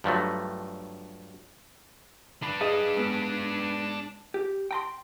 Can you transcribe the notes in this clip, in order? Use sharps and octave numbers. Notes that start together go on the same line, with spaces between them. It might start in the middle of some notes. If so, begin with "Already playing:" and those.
G2 F3 F#3 A3
D4 B4
G#4 D#5 F5
G#2 B3
G4
G5 A#5 C6